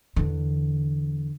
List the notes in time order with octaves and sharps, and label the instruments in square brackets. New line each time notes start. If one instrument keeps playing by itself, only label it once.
[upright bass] E2 D3